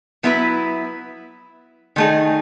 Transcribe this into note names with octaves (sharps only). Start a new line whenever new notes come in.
F#3 B3 E4 B4
D#3 A3 D#4 G#4